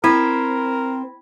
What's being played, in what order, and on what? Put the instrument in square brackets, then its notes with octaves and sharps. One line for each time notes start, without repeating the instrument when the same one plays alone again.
[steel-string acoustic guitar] C4 [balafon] E4 [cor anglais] A#4 [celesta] B5 G#6 B6